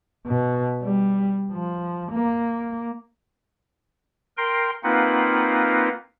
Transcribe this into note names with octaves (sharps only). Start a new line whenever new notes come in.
B2
G3
F3
A#3
A#4 G5 C6
A#3 C4 D#4 F4 B4 F#5